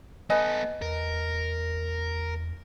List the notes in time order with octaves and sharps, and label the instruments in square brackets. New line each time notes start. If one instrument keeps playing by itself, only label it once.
[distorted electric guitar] B3 A4 [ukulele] B4 D#5 G#5
[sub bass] E2 [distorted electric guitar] A#4